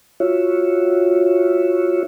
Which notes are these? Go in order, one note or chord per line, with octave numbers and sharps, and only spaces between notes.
F4 F#4 C#5 E5